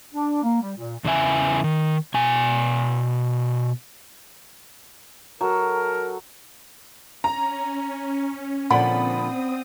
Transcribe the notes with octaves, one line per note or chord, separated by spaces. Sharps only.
D4
A#3
G3
A#2
E2 C#3 E3 E5 G#5
D#3
B2 G#5
F#3 A4 A#4
C#4 A#5
A#2 D3 F3 C4 D5 F#5 B5 D#6